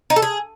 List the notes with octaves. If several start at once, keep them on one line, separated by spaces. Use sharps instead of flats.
D#4
A4
G#4